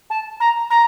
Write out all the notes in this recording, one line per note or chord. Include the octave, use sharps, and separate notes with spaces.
A5
A#5
A#5